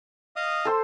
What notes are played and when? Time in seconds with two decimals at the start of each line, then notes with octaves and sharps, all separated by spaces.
0.36 D#5 F5 D#6
0.65 A4 C5 C6